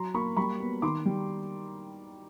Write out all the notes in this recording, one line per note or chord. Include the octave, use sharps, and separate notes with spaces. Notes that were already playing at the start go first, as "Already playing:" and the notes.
Already playing: F#3 A#5 C6
A#3 B5 C#6
G3 B5 C#6
B3
D#3 C6 D6
G3